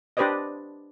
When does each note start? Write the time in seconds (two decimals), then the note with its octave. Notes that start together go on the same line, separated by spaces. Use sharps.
0.17 D4 G4 B4 C5 D5 D#5